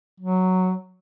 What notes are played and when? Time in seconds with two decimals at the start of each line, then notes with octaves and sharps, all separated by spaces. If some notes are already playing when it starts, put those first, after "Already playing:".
0.20 F#3